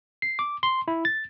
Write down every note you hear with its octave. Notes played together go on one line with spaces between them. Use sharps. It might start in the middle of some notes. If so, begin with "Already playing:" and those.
C7
D6
C6
E4
A6